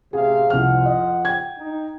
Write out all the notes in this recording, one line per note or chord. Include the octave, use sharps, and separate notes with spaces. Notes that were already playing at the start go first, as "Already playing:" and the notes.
A1 C3 G#4 F5
C2 F2 F3 F#5 F6
D#5
G5 G#6
D#4